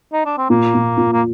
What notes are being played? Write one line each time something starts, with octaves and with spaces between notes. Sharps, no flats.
D#4
D4
C4
A#2 A#3
A#2
A#2
A#3